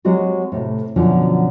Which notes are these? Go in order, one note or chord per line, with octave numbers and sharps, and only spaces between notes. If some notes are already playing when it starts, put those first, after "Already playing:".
F#3 G#3 C4 F#4 G4
A2 C3
F#2 B2 D3 F3 F#3